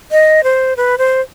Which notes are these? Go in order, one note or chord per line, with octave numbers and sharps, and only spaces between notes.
D#5
C5
B4
C5